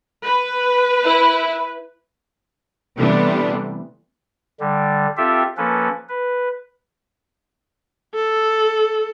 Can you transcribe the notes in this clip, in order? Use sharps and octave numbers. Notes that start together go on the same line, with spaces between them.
B4
E4
C3 E3 G3 A3 B3 D4
D3 G3
C4 F4 G4 A4 E5
F3 A#3 C#4 A4 B4
B4
A4